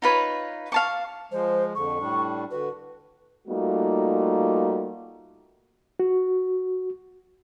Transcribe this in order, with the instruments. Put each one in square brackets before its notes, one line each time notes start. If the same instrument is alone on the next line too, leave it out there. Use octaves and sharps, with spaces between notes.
[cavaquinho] D#4 F4 B4 C#5
F5 A5 C#6
[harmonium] F3 G#3 [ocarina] C5
[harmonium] F2 D3 [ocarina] C#6
[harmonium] A2 G3 D4
[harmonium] D3 F#4 [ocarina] B4
[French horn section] G3 A3 A#3 D#4 F4 F#4
[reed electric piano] F#4